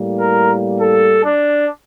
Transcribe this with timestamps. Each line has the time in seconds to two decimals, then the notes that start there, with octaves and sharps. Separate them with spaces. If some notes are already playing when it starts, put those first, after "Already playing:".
Already playing: A2 G3 A#3
0.20 A#4
0.80 A4
1.25 D4